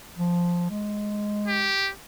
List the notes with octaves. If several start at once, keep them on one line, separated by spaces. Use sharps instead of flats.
F3
G#3
G4